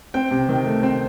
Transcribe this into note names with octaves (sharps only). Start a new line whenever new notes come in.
C4 G5
C3
D#3
A3
C4